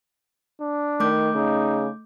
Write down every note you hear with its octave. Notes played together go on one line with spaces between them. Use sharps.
D4
D#3 A3 D6 G6
C#3 D#4